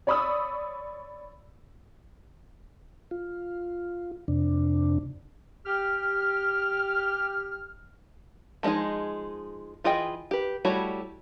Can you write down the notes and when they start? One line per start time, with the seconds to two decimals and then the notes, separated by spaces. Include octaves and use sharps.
0.07 C#5 D5 B5 C#6 D#6 E6
3.11 F4
4.28 F2 C3 D4
5.66 G4 F6
8.63 F3 G#3 D4 D#4 G#4
9.84 E3 F4 G#4 D#5 G5
10.31 G4 B4
10.65 G3 A3 E4 F#4 C#5